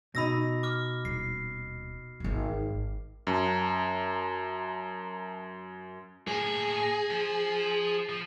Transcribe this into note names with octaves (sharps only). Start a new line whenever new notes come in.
B2 D#4 B5 E6 A#6
D6 F6
D#1 C7
G#1 D#3
F#2 A5 A#5
A2 A#3 G#4
F3
F3